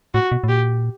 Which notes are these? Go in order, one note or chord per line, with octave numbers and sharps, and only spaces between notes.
A2 F#4
B2
A2
A#2 G4